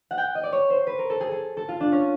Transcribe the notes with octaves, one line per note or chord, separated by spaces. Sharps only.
F#5
G5
D#5
D5
C#5
C5
B4
A#4
A4
G#4
A4
A4
F4
D4
C#4